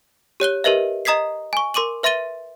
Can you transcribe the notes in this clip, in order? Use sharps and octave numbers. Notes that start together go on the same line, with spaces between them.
G4 C#5 F#6 G7
G4 A#4 B4 D#5 E5
D#5 A#5 D#6 G#6 B6 C7
G#5 C#6
A#4 C6 D6 D#7 F#7
B4 E5 C6 A6 D#7 G7